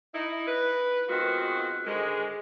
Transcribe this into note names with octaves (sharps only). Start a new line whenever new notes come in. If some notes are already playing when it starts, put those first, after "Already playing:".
D#4 E4
B4
B2 D#3 G#3 C4 F4 F#4
G#2 D3 D#3 G#3